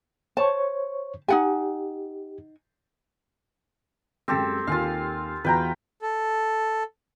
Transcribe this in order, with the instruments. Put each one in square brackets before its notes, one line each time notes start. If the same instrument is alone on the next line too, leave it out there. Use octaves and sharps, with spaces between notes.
[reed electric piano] C5 C#5 C#6 [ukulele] A5
[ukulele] D#4 F#5 G#5 [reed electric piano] G4
[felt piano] F#2 G#3 [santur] C4 G4 A4
[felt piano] D#2 G#5 [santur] F4 F5
[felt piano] E2 F4 F#4 [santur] B4 G5 A#5
[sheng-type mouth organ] A4